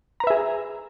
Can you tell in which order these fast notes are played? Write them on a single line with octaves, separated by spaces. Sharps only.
A#5 B4 E5 G#4